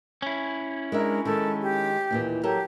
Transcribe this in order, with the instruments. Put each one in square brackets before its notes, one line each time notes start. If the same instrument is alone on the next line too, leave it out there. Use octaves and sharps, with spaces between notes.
[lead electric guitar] C#4 E4
[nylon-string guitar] G#3 D4 E5 [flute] A#4
[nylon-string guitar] D#3 G#3 [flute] A4
[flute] G4
[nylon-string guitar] D#2 A#2 E3
[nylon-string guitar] F#3 A4 A#4 [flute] G4